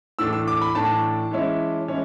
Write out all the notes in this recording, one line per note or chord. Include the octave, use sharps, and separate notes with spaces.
A2 E3 A3 D4 E6
E6
D6
B5
A2 E3 A3 D4 A5
E3 G#3 C#4 E4
E3 G#3 C#4 E4